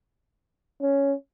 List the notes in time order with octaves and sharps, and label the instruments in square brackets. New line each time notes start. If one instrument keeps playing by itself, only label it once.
[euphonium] C#4